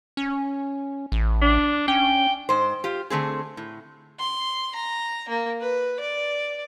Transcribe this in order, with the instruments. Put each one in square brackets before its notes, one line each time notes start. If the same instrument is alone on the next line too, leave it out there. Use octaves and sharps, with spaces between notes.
[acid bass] C#4
A1
[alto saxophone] D4
[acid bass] C#4 [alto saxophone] G5
[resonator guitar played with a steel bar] G#2 C5
F4 G4
D3 A3 C4 G#4
A2
[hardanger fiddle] C6
A#5
A#3
B4
D5